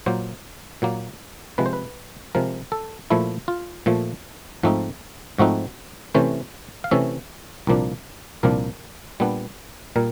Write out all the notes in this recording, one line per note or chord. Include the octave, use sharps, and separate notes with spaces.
A#2 F#3 A#3 C5
A#2 F#3 A#3
C3 F3 G#3 B4
C5
B4
C3 F3 G#3 A#4
A4
A#2 F3 A3 E4
F4
A#2 F3 A3
G#2 F3 A3 C4 D#4
G#2 F3 A3 C4 D#4 F#4
C3 E3 A3 C#4 C5
F5
C3 E3 A3 C#4 E5
C2 A#2 F3 A#3 D4
C2 A#2 F3 A#3 D4 A#4
A#2 G3 B3 D4
A#2 G3 A#4